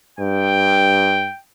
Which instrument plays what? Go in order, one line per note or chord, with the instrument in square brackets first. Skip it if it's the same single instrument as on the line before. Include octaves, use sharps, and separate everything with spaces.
[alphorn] G2 [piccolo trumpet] G5